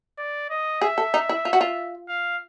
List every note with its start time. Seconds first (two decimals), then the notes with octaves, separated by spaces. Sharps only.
0.18 D5
0.50 D#5
0.81 G#4 E5
0.98 A4
1.14 D#4
1.29 E4
1.45 F4
1.53 F#4
1.61 F4
2.09 F5